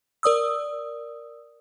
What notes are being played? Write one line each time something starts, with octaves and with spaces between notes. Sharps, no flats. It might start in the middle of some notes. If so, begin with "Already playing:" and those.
A#4 D5 D#6 E6